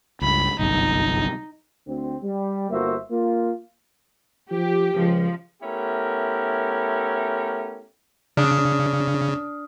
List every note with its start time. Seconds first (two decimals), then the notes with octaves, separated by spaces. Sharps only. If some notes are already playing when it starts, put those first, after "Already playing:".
0.21 C#2 G2 B5
0.59 G1 C2 F#2 D#4
1.87 D2 D3 C4
2.23 G3
2.70 G1 A#3 F#4 C5 E5
3.10 A#3 F4
4.51 F3 G4
4.95 C#2 F3
5.62 A3 B3 C#4 E4 G4 A#4
8.37 C#3 D4 D#6 F6